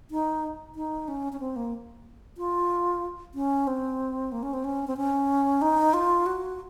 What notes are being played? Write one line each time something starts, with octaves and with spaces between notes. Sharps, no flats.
D#4
D#4
C#4
C#4
C4
A#3
F4
C#4
C4
A#3
C#4
C4
C#4
C4
C#4
D#4
F4
F#4